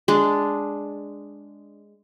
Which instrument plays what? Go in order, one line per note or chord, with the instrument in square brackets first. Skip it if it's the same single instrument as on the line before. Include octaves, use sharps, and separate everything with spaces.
[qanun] G#3 D4